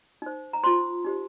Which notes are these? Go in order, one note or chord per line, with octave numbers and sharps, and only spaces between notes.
D#4 C5
A#5
F4 C5 C6
D#4 G4 C5